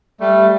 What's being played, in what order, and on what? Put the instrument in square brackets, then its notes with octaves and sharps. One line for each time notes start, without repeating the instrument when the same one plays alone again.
[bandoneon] G3 A3